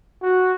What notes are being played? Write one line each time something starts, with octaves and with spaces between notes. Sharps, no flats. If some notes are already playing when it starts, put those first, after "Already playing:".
F#4